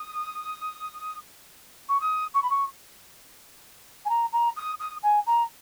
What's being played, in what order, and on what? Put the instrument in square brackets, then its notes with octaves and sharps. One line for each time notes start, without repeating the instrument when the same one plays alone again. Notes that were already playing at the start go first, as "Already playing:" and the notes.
Already playing: [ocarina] D#6
C#6
D#6
C#6
B5
C#6
G#5
A#5
A#5
D#6
D#6
G#5
A#5